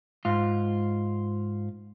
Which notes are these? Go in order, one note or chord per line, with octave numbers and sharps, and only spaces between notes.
G#2 F4